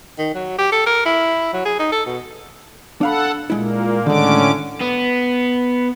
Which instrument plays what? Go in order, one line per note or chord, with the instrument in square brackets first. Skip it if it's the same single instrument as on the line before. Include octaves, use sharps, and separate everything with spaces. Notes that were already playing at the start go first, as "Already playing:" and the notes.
[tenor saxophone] D#3
F#3
G4
A4
A#4
E4
F#3
G#4
D#4
A4
B2
[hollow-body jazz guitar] D4 F5 B5 [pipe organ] A4 F#5
[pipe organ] A#2 A#3 [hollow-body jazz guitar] G#3 E4
[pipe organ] A2 C#4 D6 [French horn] D3 [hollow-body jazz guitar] D#3 G#3
[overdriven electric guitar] B3